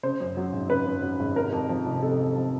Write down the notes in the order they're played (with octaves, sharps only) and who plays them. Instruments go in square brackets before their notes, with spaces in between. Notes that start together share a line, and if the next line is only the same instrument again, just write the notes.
[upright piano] C#3 C5
F#2
F#3
G#1
C#3 B4
F#2
F#3
G#1
C3 A#4
F2
F3
F1
C3 A4
F2
F3